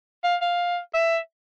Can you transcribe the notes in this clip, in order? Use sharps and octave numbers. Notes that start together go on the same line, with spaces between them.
F5
F5
E5